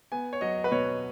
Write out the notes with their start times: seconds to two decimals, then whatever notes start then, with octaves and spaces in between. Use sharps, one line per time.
0.12 B3 G#5
0.33 C#5
0.41 F#3 D#5
0.64 B4
0.72 B2 C#5